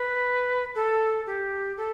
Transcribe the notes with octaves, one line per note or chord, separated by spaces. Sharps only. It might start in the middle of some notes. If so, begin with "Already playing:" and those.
Already playing: B4
A4
G4
A4